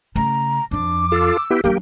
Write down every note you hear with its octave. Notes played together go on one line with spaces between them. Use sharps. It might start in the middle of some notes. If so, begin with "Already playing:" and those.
C#3 A3 A#5
F2 F3 D4 D6
F4 A4 E6
B3 E4 G4
F#3 A#3 D4 G4